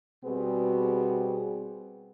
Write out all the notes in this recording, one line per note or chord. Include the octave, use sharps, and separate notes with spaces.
B2 G3 B3 C4 F#4 G#4